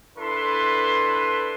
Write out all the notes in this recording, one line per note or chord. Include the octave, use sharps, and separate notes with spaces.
D4 E4 A4 B4 C6